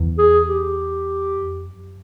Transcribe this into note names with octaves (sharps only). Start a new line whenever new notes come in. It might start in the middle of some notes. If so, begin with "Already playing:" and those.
Already playing: E2
G#4
G4
F2
F#2